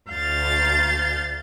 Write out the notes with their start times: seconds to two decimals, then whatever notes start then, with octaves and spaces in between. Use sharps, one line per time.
0.10 D2 F5 G6 A6